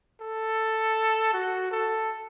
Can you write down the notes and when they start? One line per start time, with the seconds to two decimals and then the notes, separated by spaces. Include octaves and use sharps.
0.21 A4
1.33 F#4
1.71 A4